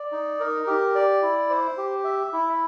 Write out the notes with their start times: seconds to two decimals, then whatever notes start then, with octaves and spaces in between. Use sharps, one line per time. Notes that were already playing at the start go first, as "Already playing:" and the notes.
Already playing: D5
0.12 D#4
0.40 A#4
0.67 G4
0.95 D5
1.22 E4
1.50 C5
1.78 G4
2.04 E5
2.33 E4